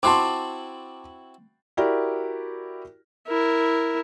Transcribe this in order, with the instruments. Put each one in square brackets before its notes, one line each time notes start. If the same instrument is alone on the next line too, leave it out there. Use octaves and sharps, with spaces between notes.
[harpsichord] C4 E4 F#4 [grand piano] A5 C6 D6
[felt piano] E4 F#4 G4 A#4 D5
[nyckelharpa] E4 A#4